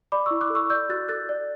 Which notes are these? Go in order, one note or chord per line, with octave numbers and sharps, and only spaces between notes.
D5 B5 D6
E4 C#6 E6
D6 F#6
A4
C#6 E6
D5 E6 G6
F#4 F#6 A6
A4 F#6 A6
D5